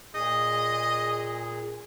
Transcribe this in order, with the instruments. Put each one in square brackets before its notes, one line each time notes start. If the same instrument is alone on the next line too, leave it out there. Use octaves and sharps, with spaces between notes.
[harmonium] A#2 G#4 [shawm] D#5